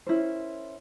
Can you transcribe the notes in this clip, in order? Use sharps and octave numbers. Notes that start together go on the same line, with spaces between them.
C#4 E4 A#4 C5